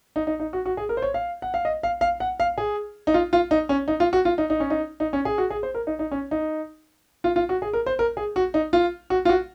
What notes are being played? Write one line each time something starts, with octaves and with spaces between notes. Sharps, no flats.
D#4
D#4
D#4
F#4
F#4
G#4
A#4
C5
C#5
F5
F#5
F5
D#5
F5
F5
F#5
F5
G#4
D#4
F4
F4
D#4
C#4
D#4
F4
F#4
F4
D#4
D#4
C#4
D#4
D#4
C#4
G#4
F#4
G#4
C5
A#4
D#4
D#4
C#4
D#4
F4
F4
F#4
G#4
A#4
C5
A#4
G#4
F#4
D#4
F4
F#4
F4
F#4